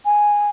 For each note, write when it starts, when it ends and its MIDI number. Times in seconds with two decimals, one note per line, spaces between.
0.05 0.50 80